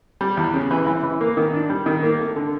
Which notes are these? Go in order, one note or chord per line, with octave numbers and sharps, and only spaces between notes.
G3
E2
C#3
E3
E3
E3
A#3
D#3
D4
G3
D#3
A#3
A3
D3